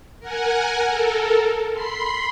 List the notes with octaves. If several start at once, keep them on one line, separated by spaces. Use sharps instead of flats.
A#4 F#5 G#5
A4 A#4
B5 C6 C7